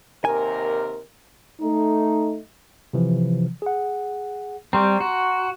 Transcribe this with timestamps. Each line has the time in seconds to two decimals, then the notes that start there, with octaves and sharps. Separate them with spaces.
0.25 D#2 C3 A#4 G#5
1.61 A3 D#4
2.93 C3 E3 F3
3.62 G#4 F#5
4.73 G3 C4 A#5 C6 C#6
5.00 F#4